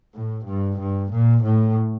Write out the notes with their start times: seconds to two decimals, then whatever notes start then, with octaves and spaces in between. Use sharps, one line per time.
0.15 A2
0.46 G2
0.79 G2
1.11 A#2
1.44 A2